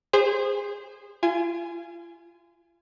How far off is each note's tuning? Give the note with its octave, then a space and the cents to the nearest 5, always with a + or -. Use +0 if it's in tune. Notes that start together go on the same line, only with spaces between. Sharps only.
G#4 -25 C5 +0
F4 -35 G#5 +0